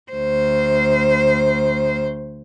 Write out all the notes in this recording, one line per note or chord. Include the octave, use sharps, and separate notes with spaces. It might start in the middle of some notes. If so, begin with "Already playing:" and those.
D2 C5